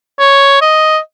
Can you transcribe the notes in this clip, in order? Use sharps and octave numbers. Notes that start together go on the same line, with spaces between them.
C#5
D#5